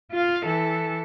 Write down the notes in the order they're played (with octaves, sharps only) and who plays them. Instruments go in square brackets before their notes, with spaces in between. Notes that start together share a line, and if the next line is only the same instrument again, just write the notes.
[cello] F4 F5
E3 A4